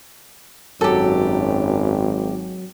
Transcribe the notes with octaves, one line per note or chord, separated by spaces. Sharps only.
G#1 F#2 F#3 G4 A4